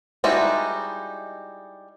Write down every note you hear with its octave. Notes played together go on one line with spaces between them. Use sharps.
G3 G#3 D#4 E4 F#4